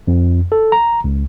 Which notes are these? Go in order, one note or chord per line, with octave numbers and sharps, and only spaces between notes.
F2
A4
A#5
C#2